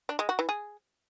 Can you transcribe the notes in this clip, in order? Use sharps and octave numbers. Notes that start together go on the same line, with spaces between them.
D4
G#3
F#4
E3
G#4